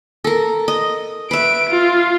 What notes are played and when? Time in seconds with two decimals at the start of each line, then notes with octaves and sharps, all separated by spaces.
0.24 A4 A#4
0.68 D#5
1.31 B4 E5 D7
1.69 F4